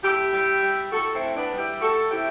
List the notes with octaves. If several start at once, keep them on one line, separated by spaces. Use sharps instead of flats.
A2 E4 G4
G3
G3
A2 F#4 A4
C4 E4
A2
B3 D4
G3
E4 G4
A3 F#4 A4
C3 E4 G4